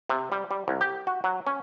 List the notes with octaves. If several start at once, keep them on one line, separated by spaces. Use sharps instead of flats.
C3
G3
G3
C2
G4
F#4
F#3
C#4